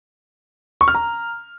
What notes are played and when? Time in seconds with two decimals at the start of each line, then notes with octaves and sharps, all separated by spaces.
0.81 C#6
0.88 F6
0.95 A#5